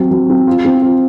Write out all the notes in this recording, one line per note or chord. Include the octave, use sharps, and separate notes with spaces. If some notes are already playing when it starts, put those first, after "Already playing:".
Already playing: F#3 C4
F#3
C4
F4
C4
F4